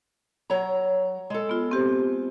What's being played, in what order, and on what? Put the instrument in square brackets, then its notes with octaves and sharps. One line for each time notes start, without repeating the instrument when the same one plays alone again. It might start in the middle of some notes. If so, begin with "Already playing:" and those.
[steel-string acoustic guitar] F#3 C#5 A#5
G#3 A4
[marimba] B3 F4
C4 G4 C5